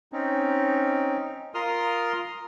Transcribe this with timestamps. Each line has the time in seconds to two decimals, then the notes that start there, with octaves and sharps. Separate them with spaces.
0.12 C4 C#4 D#4
1.54 F4 A#4 C6 D#6 F6